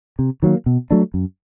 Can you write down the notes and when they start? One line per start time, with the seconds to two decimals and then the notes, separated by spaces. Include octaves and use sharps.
0.19 C3
0.43 D#3 F#3 A#3
0.66 B2
0.91 F#3 A3 D4
1.14 F#2